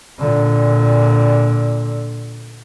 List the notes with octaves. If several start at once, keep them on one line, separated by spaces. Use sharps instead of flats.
A#2 D3